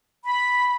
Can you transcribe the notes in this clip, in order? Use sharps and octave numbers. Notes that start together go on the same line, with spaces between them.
B5